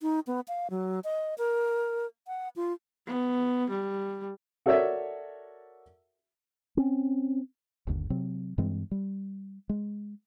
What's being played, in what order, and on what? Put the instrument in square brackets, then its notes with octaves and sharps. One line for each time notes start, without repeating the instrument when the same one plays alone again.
[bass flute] D#4
B3
F5
F#3
D#5
A#4
F#5
F4
[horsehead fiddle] B3
G3
[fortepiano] F#4 A4 A#4 C#5 D5 E5
[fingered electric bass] C4 C#4
G1 D#2 D3
C3 F#3 C4
G2 E3 G#3 C4
G3
G#3